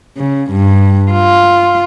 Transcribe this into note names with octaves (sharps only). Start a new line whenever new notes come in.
C#3
G2
F4